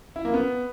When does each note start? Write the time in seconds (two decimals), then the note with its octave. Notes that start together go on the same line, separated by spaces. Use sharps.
0.16 E4
0.25 A#3
0.34 B3